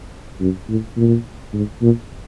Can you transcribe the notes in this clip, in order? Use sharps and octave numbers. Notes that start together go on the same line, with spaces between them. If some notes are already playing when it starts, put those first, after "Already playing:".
F#2
A2
A#2
G#2
A#2